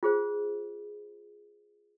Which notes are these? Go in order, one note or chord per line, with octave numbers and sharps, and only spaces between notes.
F4 G#4 C5